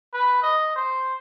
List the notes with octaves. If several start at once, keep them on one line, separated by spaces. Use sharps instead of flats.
B4
D#5
C5